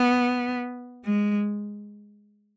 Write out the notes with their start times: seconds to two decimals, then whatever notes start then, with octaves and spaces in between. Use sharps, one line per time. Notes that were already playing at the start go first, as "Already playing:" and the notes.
Already playing: B3
1.05 G#3